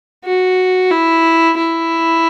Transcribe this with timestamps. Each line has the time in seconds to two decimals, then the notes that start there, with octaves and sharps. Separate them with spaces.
0.25 F#4
0.91 E4
1.58 E4